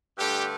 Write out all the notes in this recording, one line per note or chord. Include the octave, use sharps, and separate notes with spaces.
G2 D3 A3 G4